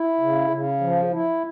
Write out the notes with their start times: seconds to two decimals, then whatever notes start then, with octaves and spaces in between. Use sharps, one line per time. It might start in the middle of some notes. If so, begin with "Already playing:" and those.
Already playing: E4
0.20 C#3
0.50 C#3
0.81 F3
1.12 E4